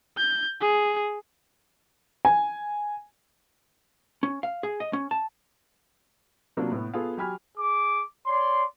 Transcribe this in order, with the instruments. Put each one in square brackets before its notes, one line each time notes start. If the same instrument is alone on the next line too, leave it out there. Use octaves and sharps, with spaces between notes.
[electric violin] G6
G#4
[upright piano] G#5
[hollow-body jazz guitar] C#4
F5
G#4
D#5
C#4
A5
[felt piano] C3 F#3 A#3 B3 D4 F4
A2 B3
B3 F4 G#4 A4 F5
F#3 G4 G#5 B5 F6
[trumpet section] G#4 D6
[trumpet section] C#5 D5 [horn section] C6